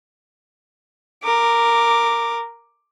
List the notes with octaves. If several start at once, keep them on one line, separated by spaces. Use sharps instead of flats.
A#4 D6